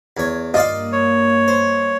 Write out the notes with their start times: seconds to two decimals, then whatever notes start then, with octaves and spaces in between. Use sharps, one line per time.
0.17 E2 C#5
0.54 G2 A#3 F4 D5 D#5 F5
0.92 C#5
1.48 C5